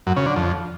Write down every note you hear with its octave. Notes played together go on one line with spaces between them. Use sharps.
F#2
C#3
D3
F2